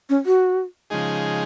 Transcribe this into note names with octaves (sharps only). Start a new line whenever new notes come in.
C#4
F#4
C#3 F3 G#3 D#4 G#4